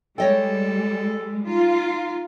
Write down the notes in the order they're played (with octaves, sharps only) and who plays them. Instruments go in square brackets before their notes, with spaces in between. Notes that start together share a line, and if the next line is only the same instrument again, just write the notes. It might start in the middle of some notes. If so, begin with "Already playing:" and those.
[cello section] G3 G#3 [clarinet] A4 [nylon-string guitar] C#5 D#5 G5
[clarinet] D#4 [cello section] F4